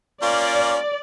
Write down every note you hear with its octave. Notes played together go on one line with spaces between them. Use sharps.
A#3 C#4 F4 D5